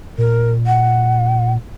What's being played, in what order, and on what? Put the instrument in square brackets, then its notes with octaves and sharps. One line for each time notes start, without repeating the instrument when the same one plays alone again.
[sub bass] A#2 [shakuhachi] A#4
[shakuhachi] F#5